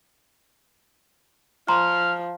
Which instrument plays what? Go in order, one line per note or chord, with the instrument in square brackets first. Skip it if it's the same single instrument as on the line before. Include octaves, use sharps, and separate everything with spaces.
[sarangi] F3 [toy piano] A#5 [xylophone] C6 [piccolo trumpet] F6